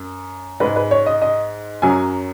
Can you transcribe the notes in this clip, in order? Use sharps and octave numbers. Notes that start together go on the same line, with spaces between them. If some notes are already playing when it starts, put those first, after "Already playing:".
Already playing: F#2
G#2 G#3 B4
B4
C#5
D#5
D#5
F#2 F#3 G#5